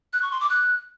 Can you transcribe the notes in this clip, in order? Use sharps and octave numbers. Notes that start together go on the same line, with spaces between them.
F#6
C#6
C6
D6
F#6